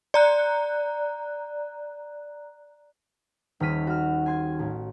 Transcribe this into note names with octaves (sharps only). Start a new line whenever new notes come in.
D5 A#5 F#6
D#1 D#2 F6 B6 D#7
F#4 F6
G#5 C6 G#6
A1